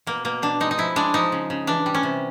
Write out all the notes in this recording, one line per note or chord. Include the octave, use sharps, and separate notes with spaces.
B2 A#3
B2 A#3
B2 D4
G#3 D#4
D#4
F3 E4
G#3 D4
F3 D#4
C#3
C#3
E3 D4
G3
C#4
C3